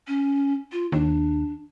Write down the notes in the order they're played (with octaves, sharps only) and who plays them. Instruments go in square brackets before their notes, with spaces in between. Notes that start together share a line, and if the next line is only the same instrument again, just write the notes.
[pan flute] C#4
F4
[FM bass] D#2 [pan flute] D4